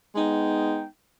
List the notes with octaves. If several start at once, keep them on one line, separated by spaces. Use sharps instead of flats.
G#3 B3 D#4 G5